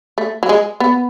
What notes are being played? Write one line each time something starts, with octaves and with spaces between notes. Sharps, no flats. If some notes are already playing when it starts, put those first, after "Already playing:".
A3
F#3
G#3
B3